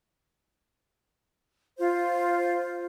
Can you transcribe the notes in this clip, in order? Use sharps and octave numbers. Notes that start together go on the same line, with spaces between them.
F4 C5